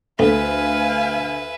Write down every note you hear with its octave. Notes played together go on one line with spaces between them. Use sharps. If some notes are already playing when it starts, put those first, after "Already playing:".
D2 A3 B3 F4 B4 E5 F5 G#5